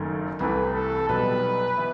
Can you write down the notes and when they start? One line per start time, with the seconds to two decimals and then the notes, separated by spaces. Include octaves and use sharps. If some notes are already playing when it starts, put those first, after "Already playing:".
Already playing: F#1 F#2 D#3 A3
0.40 C2 C3 E3 A3 B4
0.74 A4
1.09 B1 B2 G3 D#4 B4
1.77 E3 B3 E4